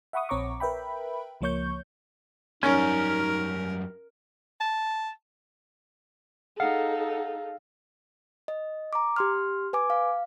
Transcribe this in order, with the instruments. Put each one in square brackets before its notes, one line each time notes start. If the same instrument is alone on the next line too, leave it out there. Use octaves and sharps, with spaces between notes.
[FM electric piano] E5 F#5 B5 C#6 D#6
A#1 C4 C#5 A#5 C#6 D6
A#4 B4 E5 G5 B5
C#2 F3 A#3 C#5 C#6 G6
[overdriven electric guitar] F#2 G3 [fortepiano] C#4 [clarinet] D#4 [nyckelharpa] A#4
[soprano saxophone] A5
[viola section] D#4 A4 [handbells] G#4 [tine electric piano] F5 [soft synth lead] F#5
[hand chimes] D#5
A#5 D6
G4 C6 F6
B4 G#5 D6
F5